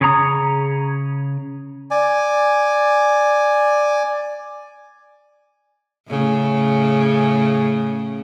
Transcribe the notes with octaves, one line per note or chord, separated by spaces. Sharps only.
C#3 G#4 C#5 A#5 D#6
D5 G#5
A2 C#3